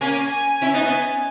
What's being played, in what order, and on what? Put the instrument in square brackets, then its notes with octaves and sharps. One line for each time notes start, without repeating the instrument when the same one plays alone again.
[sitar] A#3 C#4 [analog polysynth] G#5
[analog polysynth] G#5
[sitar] C#4 E4
B3 D#4
B3